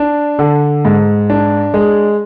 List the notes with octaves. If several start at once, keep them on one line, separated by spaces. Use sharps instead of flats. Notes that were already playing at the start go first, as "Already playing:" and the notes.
Already playing: D4
D3
G#2
D4
G#3